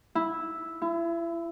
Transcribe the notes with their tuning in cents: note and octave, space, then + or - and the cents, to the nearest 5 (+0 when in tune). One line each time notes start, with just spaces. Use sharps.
E4 -5
E4 +35